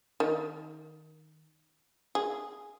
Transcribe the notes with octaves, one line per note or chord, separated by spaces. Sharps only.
D#3
G#4